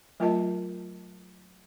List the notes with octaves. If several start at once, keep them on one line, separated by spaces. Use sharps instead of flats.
F#3 A3 F4 A#4 D#5 A5